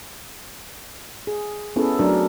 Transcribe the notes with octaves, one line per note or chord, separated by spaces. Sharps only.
G#4
B3 C#4 E4 G#4 A4
F#3 A3 D4 A#4